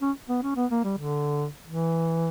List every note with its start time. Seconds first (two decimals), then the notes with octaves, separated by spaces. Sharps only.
0.02 C#4
0.29 B3
0.43 C#4
0.56 B3
0.71 A#3
0.84 G3
0.98 D3
1.67 E3